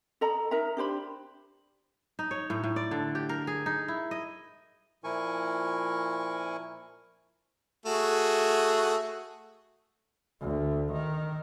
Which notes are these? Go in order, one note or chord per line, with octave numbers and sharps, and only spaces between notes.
A4 D#5 A#5 B5
D#4 A#4 E5 A#5
D4 G4 C5 B5
D#4
C#5
A2
A2
D5
D3
G4
A#4
G#4
D#4
E4
D#5
A#2 F3 E4 A#4 G#5 C#6
A3 F#4 G#4
D2
D#3